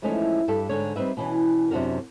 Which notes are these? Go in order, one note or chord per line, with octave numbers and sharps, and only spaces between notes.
E3 F3 G#3 A3 C#4 D#4
G2 G4 A4
G#2 D3 C#5
G3 C4 D#4 B4 E5
B2 E3 C#4
F#2 C3 D4 F#4 A#4